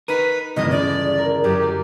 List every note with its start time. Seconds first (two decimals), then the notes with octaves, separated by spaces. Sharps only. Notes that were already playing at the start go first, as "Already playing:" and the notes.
0.08 D#4 A#4 B4 D#7
0.56 G1 E2 C3 D#3 A3 D#5
0.71 C#3 D5
1.18 A#4
1.44 F#2 G4
1.63 D5